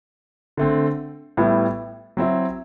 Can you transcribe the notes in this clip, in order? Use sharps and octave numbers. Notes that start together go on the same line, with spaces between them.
D3 A3 C4
A2 G3 B3 E4
F#3 C4 E4